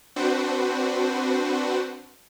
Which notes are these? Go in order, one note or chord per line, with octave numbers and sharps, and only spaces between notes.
C4 D4 F#4 B4 C5